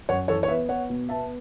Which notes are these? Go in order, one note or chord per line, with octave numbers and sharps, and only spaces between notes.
F#2 C#5 F#5
E3 A4 C#5
C#5
B3 B4 E5
B3 C#5 F#5
B2
B3 E5 A5